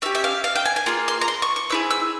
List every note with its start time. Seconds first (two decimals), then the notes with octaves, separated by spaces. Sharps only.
0.02 C#4 G4 E5
0.15 E5
0.24 F5
0.44 F5
0.56 G5
0.66 G#5
0.76 G#5
0.86 A#3 F4 G#4 C6
1.08 C6
1.21 A#5
1.28 C6
1.42 C#6
1.56 C#6
1.70 C4 E4 G#4 E6
1.91 E6